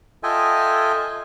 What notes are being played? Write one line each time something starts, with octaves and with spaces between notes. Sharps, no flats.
F4 A4 D#5 E5 G5 G#5